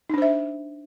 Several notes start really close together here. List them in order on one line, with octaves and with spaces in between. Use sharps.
D#4 D4 C5 E5